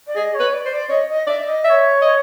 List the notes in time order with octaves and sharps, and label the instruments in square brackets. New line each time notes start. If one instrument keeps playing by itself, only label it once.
[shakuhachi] D5
[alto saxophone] G#4 [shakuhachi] D#5
[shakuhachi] C#5
[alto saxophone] B4
[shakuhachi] D5
[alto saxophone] C5
[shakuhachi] D5
[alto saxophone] C#5 [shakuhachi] D#5
[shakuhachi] D#5
[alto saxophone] D5 [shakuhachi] E5
[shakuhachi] D#5
[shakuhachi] D5 [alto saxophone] E5
[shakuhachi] C#5
[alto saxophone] D#5